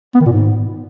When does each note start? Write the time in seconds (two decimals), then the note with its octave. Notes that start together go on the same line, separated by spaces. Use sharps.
0.15 B3
0.20 D#3
0.26 A#2
0.32 G#2